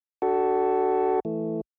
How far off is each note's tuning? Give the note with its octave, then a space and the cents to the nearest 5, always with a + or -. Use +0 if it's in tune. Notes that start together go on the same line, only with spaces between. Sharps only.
D4 +0 F#4 +25 A4 +0
E3 +0 A3 +0